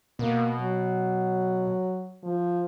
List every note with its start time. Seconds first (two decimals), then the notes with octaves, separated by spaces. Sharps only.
0.19 B2 A#3
0.57 F#3
2.23 F3